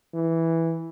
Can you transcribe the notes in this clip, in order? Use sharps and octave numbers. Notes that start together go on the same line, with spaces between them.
E3